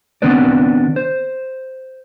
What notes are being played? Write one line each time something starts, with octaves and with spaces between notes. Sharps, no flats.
D#3 B3 C4 D4 B4 D5
C5